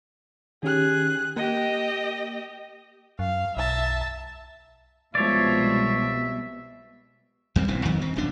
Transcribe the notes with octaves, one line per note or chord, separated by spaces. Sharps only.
D#3 C#4 G4 G#4 F#6
A#3 G4 D#5
F#2 F5
B1 E5 A5
C2 B2 F3 G#3 C#5 D5 E5
D#2 G3 C4
E1 B1 E3 C4
F2 D#3 F#3
D#3 C4
D#1 F#2 B2 D4